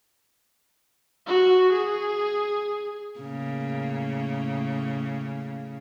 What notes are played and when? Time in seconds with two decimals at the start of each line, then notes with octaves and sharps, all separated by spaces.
1.27 F#4
1.72 G#4
3.20 A2 C#3 A#3